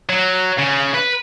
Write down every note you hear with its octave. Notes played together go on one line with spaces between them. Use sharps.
F#3
C#3
B4